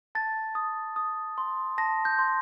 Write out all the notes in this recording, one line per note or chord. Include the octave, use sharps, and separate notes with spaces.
A5 A6
D#6
D#6
C6
A5 A#6
G6
C6